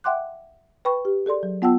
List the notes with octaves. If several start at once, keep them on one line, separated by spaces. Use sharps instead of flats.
E5 F#5 G5 C6 D6 F#6
B4 G5 B5 C#6
G4
G#4 A4 D5 C6
F#3
B3 F4 F#5 G5 A5 E6